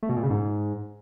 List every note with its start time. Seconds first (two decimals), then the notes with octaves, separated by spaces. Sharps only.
0.03 A3
0.09 B2
0.16 A#2
0.23 C#3
0.30 G#2